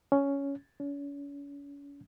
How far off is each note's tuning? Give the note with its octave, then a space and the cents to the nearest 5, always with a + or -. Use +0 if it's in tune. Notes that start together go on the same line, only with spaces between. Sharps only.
C#4 +10
C#4 +40